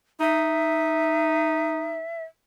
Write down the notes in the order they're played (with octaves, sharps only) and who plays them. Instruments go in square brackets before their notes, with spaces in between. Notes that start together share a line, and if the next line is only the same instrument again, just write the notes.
[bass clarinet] D#4 [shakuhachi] E5